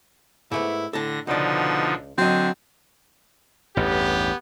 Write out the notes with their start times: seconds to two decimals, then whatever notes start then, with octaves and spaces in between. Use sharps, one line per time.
0.52 G#2 A3 B3 E4
0.93 A2 D3 A4 A5 A#6
1.27 C#2 B2 D3 F3 D#4 D5
2.18 D3 F#3 C4 D#5
3.77 A1 E2 G2 B3 G4